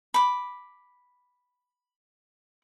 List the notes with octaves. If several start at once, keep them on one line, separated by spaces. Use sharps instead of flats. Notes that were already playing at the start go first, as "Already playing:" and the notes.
B5 D6